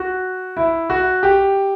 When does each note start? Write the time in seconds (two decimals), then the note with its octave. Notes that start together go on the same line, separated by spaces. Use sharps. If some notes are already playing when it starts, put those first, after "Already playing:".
Already playing: F#4
0.57 E4
0.90 F#4
1.23 G4